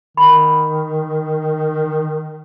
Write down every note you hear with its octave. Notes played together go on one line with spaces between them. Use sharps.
D#3 B5